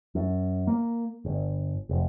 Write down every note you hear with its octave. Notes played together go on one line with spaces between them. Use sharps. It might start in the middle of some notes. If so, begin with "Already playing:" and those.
F#2
A#3
G1
F1